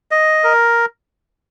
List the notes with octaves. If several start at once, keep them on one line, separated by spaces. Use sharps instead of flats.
D#5
A#4